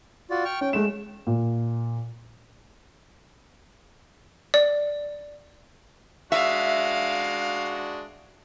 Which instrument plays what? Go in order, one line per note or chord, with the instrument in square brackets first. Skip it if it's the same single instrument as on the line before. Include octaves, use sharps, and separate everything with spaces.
[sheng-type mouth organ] F4 F#4 D5
G5 C#6 F6
[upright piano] C#4 [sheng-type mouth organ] G5
[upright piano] G#3 E7 [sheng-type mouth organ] A3
[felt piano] A#2
[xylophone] D5
[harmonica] G#3 D4 F#4 [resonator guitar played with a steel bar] E5 [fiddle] F5